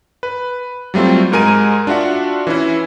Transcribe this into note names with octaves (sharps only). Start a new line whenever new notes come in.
B4
F#3 G3 A3 C4 F4
G#2 G#3 A#4 G#5 D#7
D4 F4 F#4 E5 F#5
E3 C#4 E4